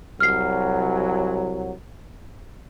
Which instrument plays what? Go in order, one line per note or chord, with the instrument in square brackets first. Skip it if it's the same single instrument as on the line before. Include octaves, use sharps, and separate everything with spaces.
[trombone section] C2 F#3 [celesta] F6 C7